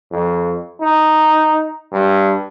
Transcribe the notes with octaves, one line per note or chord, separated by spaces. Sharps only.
F2
D#4
G2